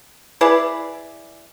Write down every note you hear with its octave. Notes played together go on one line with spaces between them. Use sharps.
E4 G#4 B4 D5